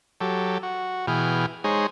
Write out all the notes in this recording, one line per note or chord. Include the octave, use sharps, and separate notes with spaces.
F#3 G4 A4
F#4
B2 E3 G#4 G5 F6
G#3 D#4 G#4 C5 C#5